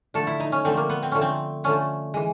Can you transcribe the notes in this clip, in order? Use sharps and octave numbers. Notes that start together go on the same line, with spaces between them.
D3 F3 A3 A4
E4
D#4
C#4
D3 F3 A3 C4
A#3
B3
C4
D3 F3 A3 C#4
C4
D3 F3 A3 C#4
E3 G#3